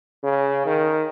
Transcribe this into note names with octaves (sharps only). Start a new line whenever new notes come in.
C#3
D#3